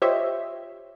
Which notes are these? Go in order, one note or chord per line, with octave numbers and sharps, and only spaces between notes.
F4 G4 C5 C#5 D#5 E5